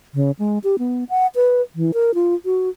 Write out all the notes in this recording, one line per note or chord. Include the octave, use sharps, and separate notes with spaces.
C#3
G#3
G4
B3
F#5
B4
E3
A#4
F4
F#4